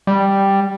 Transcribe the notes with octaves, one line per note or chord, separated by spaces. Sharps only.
G3